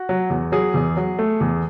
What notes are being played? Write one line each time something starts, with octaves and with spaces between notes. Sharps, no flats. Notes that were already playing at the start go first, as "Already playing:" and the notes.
Already playing: F#4
F#3
E2
F#3 G#4
E2
F#3
A3
E2